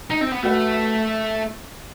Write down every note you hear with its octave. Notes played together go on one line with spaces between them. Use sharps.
D#4
C4
B3
A3 F#4 B4 F#5